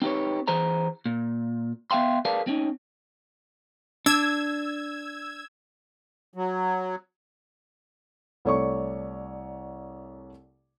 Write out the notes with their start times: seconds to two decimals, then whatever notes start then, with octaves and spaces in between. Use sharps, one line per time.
0.02 C4 D#4 G4 B4 C#5
0.48 E3 G#4 C5 A#5
1.06 A#2
1.91 B3 E5 F5 G5 C6
2.25 G#4 A#4 B4 D5 F5 A5
2.47 C4 C#4 D#4
4.06 D4 E6 G#6
6.34 F#3
8.45 C2 A3 C#5 D5 C#6